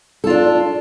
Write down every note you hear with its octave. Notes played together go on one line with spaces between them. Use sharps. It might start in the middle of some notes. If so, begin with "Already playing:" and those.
D4 F4 A4